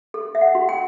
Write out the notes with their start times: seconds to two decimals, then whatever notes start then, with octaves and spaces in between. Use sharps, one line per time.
0.14 A4
0.35 E5
0.41 F#5
0.55 F#4
0.69 G5